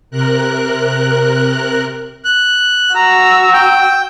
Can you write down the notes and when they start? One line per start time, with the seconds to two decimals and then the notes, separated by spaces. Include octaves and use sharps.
0.11 C3 A#4 F#6
2.25 F#6
2.95 F#4 A#5 E6
3.53 G5